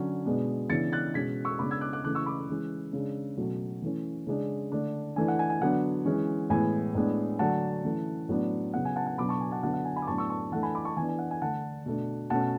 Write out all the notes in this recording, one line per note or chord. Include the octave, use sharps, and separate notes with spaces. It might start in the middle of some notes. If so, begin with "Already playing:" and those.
Already playing: D3 F#3 C#4
B2 G#3 B3 D4
C#3 E3 B3 D4 A6 C#7
F#6 A6
B2 G#3 C#4 G#6 B6
C#6 E6
C#3 G#3 B3 D4 B5 D6
E6 G#6
D6 F#6
D6 F#6
C#3 E3 A3 C#4 D6 F#6
C#6 E6
B5 D6
E3 G#3 C#4
C#3 G#3 D4
B2 F#3 A3 C#4
E3 A3 C#4
C#3 G#3 D4
D3 A3 D4
E3 A3 D4 G#5
F#5
G#5
G#5
D3 F#3 B3 D4 F#5
E3 G#3 C#4
A2 E3 G#3 B3 G#5
A2 G#3 B3 D4
D3 F#3 A3 D4 F#5 A5
E3 A3 C#4
A2 F#3 B3 D4
C#3 F#3 B3 F#5
G#5
F#5 A5
F#5 A5
B2 F#3 B3 D4 B5 D6
A5 C#6
G#5
F#5 A5
D3 F#3 B3 F#5 A5
F#5
G#5
G#5 B5
D6
A2 F#3 B3 D4 A5 C#6
C#6 E6
A5 C#6
E3 A3 D4 F#5 A5
G#5 B5
B5 D6
A5 C#6
E3 B3 D4 G#5
G#5
F#5
G#5
D3 A3 D4 F#5 A5
B2 A3 D4
B2 A3 C#4 F#5 A5